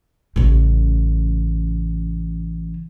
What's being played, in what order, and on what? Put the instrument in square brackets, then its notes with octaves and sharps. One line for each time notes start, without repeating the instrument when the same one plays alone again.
[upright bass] A1 C#3